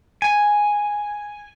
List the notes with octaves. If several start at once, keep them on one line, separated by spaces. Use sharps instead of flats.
G#5